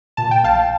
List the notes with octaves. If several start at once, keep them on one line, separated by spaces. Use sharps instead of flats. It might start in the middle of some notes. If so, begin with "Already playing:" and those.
A#2 A5
G5
A#1 F5 A5